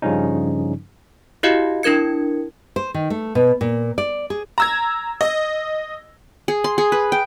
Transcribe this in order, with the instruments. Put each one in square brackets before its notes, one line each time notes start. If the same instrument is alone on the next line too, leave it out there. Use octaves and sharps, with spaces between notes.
[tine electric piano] G2 C#3 F3 G3 C#4 D#4
[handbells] E4 F#4 G4 D#5 F5
D4 E4 A#4 G#6 C#7
[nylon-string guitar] C5
D#3
A3
B2
A#2
D5
G#4
[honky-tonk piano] A#5 E6 G#6
D#5
[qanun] G#4
C6
G#4
B4
G5